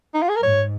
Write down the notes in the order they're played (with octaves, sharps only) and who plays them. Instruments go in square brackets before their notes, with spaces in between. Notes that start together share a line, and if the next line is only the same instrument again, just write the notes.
[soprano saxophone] D#4
F4
G#4
A#4
[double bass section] G#2 [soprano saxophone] C#5